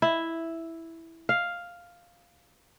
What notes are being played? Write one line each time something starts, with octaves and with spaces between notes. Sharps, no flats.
E4
F5